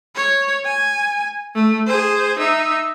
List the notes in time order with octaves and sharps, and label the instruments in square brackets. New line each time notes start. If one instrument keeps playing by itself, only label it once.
[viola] C#5
G#5
A3
G#4 C5
D#4 E5